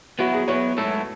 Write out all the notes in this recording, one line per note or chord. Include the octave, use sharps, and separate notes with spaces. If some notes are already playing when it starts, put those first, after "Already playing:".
F#3 B3 E4 F#4
G#4
F#3 B3 E4 C#5
G#2 F#3 A3 E4 A4